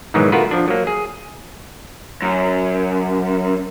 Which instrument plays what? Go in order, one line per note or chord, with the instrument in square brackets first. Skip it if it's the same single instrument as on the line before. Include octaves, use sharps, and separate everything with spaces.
[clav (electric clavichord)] G#2 B2 D#3 E3 F#3 G#3
A3 B3 F4 F#4 A#4 B4
F3 D4
F#3 A#3
G#4
[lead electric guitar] F#2